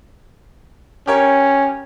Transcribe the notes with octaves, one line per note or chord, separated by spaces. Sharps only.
C#4 G4 A#4 C#5